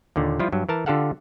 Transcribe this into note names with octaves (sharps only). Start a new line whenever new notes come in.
D#2 A#2 D3
F3 G3 E4 F4
G2 F#3
E3 A#4 A5
D3 F4 G4 A4 F5 F#5